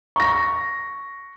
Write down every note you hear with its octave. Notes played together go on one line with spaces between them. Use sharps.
C#6 A#6